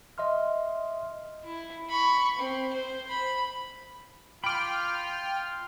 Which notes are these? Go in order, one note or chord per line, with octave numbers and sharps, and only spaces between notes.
D#5 E5 C6 F6
E4
B5 C#6
C4
C5
B5
F4 G5 B5 D6 F6